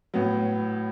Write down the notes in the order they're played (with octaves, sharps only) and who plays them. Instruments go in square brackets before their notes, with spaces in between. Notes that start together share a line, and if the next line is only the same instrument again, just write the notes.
[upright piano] A2 F#3 B3